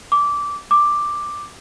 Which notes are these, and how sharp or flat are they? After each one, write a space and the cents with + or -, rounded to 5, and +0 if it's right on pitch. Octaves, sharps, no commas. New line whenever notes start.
D6 -15
D6 +5